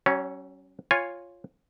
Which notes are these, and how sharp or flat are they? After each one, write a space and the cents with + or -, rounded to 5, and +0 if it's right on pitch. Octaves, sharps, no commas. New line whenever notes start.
F#3 +40 C#4 -5 C#5 +0
F4 +0 C#5 +0 G#5 -15